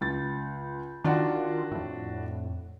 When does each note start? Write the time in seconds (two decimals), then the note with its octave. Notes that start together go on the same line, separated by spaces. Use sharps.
0.01 C#2 A6
1.04 D#3 D4 F4 F#4
1.71 F2 A2